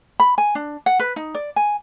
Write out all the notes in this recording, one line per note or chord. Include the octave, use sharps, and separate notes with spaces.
B5
G#5
D4
F#5
B4
D#4
D5
G#5